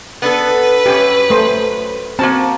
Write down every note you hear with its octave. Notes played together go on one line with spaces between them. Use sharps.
B3 D4 A4 B4
F#2 C#4 G4
A3 C5
A#3 C4 F#4 A5